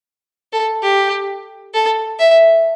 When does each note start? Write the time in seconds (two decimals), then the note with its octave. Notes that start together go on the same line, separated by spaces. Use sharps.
0.53 A4
0.82 G4
1.73 A4
2.19 E5